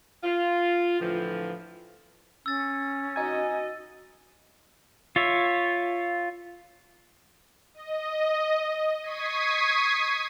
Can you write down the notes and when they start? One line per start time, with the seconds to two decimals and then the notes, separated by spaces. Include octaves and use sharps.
0.24 F4
1.00 A2 D3 E3 F3
2.46 C#4 E6 A6
3.16 D#4 F#4 D#5 G#5
5.16 F4 C#5 E5
7.74 D#5
9.02 C#6 D#6 G#6 B6 C7 D#7